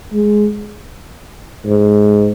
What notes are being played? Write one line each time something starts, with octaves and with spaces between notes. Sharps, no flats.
G#3
G#2